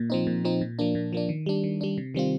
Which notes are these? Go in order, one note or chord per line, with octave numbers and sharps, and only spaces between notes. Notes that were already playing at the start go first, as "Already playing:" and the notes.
Already playing: A#2
F3 C4 D#4
A#2
F3 C4 D#4
A#2
F3 A#3 D4
A#2
F3 A#3 D4
D#3
G3 D4
D#3
G3 D4
C3
D#3 G3 C4 F4